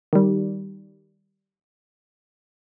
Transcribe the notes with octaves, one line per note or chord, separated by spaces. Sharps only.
D#3 G3